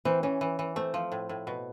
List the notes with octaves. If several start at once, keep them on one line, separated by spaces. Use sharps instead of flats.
E3 C4
E3 C#4
E3
E3
A3 C4
F3
A2
A2
B2